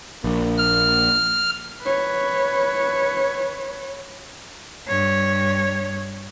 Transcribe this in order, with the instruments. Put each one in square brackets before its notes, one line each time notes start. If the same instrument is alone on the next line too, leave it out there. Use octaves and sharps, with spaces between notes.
[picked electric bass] A#1 [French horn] A#3
[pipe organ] F6
[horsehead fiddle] B4 C#5
[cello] G2 C#5